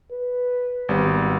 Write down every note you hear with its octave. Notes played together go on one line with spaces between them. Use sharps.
B4
G#1 G3 B3